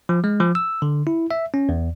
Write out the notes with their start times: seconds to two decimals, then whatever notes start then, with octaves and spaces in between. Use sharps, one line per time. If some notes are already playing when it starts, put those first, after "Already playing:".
0.09 F3
0.24 G#3
0.40 F3
0.55 E6
0.82 D3
1.07 E4
1.31 E5
1.54 C#4
1.69 E2